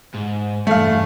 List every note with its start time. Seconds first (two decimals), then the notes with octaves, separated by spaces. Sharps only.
0.14 G#2
0.67 E2 G2 A3 F5